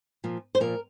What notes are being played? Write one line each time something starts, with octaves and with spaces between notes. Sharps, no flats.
A#2 F3
C5
A#2 F3 A#4